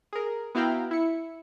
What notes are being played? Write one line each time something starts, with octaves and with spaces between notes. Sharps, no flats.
G#4 A#4
B3 E4 F#4 F5 G5 A#5
E4 C#7